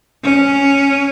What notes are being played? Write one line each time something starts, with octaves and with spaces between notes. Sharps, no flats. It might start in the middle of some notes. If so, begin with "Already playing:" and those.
C#4